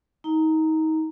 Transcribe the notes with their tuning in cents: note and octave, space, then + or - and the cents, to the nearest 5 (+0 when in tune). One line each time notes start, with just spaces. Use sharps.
D#4 +30 A#5 -10